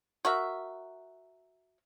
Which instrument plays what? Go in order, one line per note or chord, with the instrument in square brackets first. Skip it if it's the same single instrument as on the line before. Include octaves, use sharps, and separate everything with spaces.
[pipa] F#4 A#4 E5